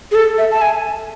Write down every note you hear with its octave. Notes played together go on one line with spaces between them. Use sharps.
G#4
A4
E5
A5
G#5